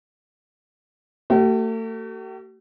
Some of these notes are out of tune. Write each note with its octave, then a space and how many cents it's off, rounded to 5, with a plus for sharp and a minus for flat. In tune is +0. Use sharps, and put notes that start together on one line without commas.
A3 +40 G4 -45